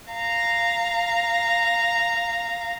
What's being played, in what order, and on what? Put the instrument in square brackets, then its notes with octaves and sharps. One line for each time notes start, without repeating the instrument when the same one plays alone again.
[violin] F5 A#5